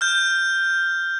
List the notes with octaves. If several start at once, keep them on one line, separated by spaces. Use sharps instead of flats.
F6 G6